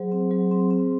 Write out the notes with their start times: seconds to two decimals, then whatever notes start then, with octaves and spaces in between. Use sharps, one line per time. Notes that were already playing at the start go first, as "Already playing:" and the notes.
Already playing: F#3 G#4 C5
0.12 C4
0.31 F#3
0.51 C4
0.71 C4